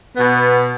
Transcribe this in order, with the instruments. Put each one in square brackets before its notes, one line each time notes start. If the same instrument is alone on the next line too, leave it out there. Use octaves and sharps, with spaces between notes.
[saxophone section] B2 B3